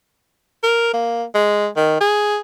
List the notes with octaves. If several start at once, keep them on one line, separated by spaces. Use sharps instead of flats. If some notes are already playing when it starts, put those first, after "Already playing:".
A#4
A#3
G#3
D#3
G#4